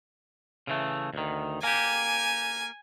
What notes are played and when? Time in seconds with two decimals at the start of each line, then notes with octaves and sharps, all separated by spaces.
0.67 C#3 E3 A3
1.14 D2 D#3
1.63 A#3 G4 G#5